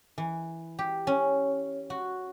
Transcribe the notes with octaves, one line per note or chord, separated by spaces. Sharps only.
E3
G4
C#4
F#4